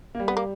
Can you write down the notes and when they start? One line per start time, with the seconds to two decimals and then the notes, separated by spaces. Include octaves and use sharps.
0.15 A#3
0.20 G3
0.28 B3
0.37 A#3